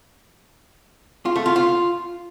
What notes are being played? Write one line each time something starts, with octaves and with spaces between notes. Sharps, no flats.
F4
A3
F4
F4